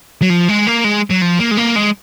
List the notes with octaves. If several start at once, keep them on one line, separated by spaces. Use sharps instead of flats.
F#3
F3
G#3
A#3
G#3
F#3
F3
A#3
G#3
A#3
G#3